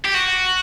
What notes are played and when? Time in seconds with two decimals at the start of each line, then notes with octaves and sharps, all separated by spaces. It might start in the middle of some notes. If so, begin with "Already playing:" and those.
0.05 G4
0.14 F#4